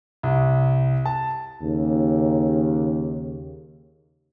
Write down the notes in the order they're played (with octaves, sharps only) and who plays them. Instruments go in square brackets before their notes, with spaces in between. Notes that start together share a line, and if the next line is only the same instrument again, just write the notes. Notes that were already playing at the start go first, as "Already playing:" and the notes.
[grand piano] C2
A5
[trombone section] D#2 C#3